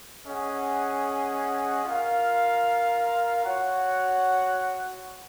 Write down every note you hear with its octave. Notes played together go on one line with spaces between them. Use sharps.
C#4 G#4 D#5 F#5
F4 A#4 F5
F#4 C#5 F#5